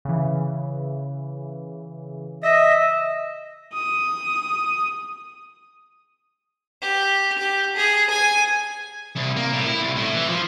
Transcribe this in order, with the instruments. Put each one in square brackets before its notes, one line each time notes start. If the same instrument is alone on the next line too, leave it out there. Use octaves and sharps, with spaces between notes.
[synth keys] C#3 E3
[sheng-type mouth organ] D#5 E5 [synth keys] A#6
[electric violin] D#6
[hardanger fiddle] G4
G4
G#4
G#5
[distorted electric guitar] C2
A#3
A2
E4
C2
A2
E3
F3